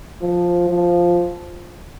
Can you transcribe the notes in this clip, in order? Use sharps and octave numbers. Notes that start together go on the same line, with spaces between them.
F3
F3